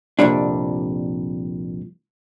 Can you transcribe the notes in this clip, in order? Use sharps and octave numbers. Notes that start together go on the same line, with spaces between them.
C2 F2 A#2 G3 D4